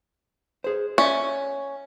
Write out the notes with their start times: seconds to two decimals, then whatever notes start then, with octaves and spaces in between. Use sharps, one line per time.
0.64 G#4 C5
0.98 C#4 D5 E5